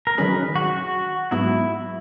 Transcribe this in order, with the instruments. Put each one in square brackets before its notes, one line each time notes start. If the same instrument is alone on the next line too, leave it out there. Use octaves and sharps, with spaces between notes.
[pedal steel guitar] A#4
[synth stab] D#3 F#3 C#4 G#4 [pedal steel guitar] B4
[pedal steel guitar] F#4
F#4
[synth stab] G#2 F#3 B3 [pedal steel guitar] E4